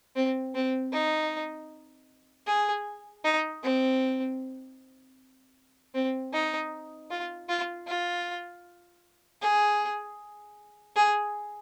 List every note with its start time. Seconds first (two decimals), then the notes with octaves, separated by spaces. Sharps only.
0.16 C4
0.55 C4
0.93 D#4
2.47 G#4
3.24 D#4
3.63 C4
5.95 C4
6.33 D#4
7.11 F4
7.49 F4
7.87 F4
9.42 G#4
10.96 G#4